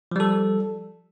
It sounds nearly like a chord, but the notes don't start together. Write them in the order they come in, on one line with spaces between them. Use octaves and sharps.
F3 G3 A4